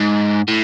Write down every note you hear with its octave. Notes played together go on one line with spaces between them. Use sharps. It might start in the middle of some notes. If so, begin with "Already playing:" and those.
Already playing: G#2
A2